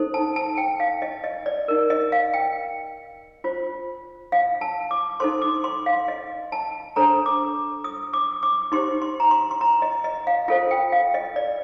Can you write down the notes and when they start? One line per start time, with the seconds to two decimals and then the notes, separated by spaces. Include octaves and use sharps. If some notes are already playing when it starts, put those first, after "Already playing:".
Already playing: D#4 A4 C5
0.14 A5
0.36 A5
0.57 G5
0.80 F5
1.02 D#5
1.24 D#5
1.46 D5
1.68 D#4 A#4
1.90 D#5
2.12 F5
2.34 G5
3.44 F4 C5
4.32 F5
4.61 A5
4.91 D6
5.20 D#4 A4 C5 C6
5.42 D6
5.64 C6
5.86 F5
6.08 D#5
6.52 A5
6.96 D4 A4 C5 A#5
7.26 D6
7.84 D#6
8.13 D6
8.43 D6
8.72 D#4 G4 C5 C6
9.02 C6
9.20 A#5
9.31 C6
9.51 C6
9.61 A#5
9.82 D#5
10.04 D#5
10.27 F5
10.48 F4 A4 C5 F5
10.71 G5
10.92 F5
11.14 D#5
11.36 D5